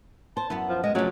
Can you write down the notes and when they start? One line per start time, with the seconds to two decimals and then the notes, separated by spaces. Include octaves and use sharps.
0.37 C5 A5
0.50 F#2 B3 E4
0.69 F3
0.84 G#3 D#5
0.95 C3 F3 F#3 A3 C#4 G#4